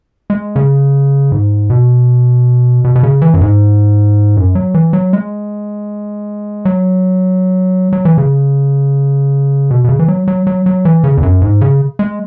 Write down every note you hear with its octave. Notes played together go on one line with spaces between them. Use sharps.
G#3
C#3
G#2
B2
B2
B2
C#3
E3
F#2
G#2
F#2
F#3
E3
F#3
G#3
F#3
F#3
E3
C#3
B2
B2
C#3
E3
F#3
F#3
F#3
F#3
E3
C#3
E2
F#2
G#2
C#3
G#3